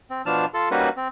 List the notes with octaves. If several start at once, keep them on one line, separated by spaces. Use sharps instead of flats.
C4
B2 F3 D4 A5 F6
F4 A4
G3 A#3 C#4 D#4 F#4 B4
C4